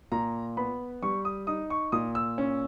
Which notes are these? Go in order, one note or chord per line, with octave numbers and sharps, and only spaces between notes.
A#2 A#5
B3 B5
G3 C#6
D#6
D#4 D#6
C#6
A#2 D#6
E6
C#4